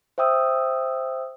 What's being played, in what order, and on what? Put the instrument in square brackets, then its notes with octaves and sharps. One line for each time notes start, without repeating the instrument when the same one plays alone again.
[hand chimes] C5 E5 G5 D#6 E6